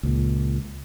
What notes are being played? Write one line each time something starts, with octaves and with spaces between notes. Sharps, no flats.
C#2 A#2